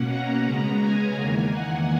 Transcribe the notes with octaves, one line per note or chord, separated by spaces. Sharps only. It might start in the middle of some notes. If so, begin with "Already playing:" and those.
Already playing: B2 A#3 C#4 F#5
A#5
C#3 G#3 B3
G#5
E2 D#3 A#3 G#5
F#5